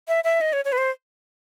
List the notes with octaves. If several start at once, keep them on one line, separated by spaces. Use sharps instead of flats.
E5
E5
D#5
C#5
C#5
B4
C5